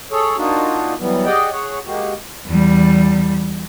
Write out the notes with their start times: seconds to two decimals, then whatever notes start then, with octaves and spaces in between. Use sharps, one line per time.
0.11 G#4 A4 C#5
0.37 A#3 D4 D#4 F4 F#4
0.99 E3 F#3 G3 B3
1.25 G4 G#4 D5 D#5 F#5 G5
1.51 G#4 C#5 F#5
1.85 G#3 A#3 F#4 G4
2.46 E2 G3